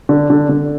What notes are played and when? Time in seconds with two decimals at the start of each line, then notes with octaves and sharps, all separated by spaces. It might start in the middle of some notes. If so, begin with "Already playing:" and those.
0.09 D3
0.30 D3
0.49 D3